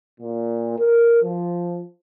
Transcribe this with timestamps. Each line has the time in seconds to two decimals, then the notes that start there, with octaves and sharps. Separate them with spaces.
0.20 A#2
0.79 A#4
1.22 F3